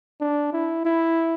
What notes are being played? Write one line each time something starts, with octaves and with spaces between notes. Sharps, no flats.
D4
E4
E4